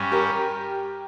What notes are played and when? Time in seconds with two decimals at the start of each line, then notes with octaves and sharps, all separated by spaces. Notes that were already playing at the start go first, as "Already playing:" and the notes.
Already playing: G2 G3 C#4
0.12 G4 A#4